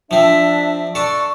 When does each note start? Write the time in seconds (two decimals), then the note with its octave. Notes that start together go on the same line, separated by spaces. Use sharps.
0.11 F3 C4 D4 E5
0.95 D4 A4 C#6